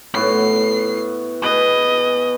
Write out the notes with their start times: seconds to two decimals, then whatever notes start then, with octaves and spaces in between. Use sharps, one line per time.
0.14 A2 B3 F#4 C7
1.43 B2 G#4 B4 D#5